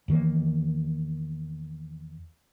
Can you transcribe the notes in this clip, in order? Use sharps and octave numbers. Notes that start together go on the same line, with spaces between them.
E2 D#3 E3 A#3